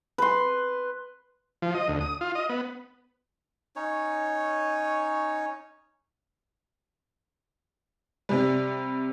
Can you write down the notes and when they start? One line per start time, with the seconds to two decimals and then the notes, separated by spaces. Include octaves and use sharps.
0.18 B4 C6
1.62 F3
1.74 D#5
1.88 D2
2.01 D#6
2.21 F4
2.35 D#5
2.49 B3
3.76 C#4 D#4 C#5
8.29 C3 G3